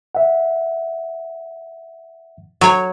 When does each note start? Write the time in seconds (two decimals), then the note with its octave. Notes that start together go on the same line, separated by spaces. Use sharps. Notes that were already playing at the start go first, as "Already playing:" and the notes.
0.15 E5 F#5
2.61 F#3 C#5